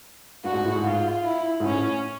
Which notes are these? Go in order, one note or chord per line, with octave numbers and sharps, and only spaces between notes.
G2 F#4
G#2
A2
G#2
F4
E4
G#2
A2 C#4